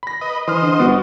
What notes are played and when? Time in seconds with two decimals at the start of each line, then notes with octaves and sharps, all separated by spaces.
0.03 B5 A#6
0.21 B4 D#5
0.48 E3 C5 D#5 F6
0.62 D3
0.80 G1 B3 F#4